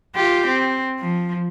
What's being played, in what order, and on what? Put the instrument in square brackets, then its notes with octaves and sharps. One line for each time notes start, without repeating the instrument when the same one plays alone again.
[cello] F4 G4
C4
F3